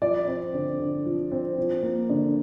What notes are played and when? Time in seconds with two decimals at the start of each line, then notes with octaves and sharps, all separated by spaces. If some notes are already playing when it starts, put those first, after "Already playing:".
0.02 F3 D5
0.27 C4
0.54 D3
0.80 D3
1.05 F3
1.31 C4
1.57 F3
1.83 A#3
2.10 D3